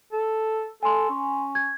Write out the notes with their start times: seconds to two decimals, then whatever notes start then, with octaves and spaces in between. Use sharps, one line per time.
0.12 A4
0.83 A4 G#5 C6
1.10 C#4
1.55 G#6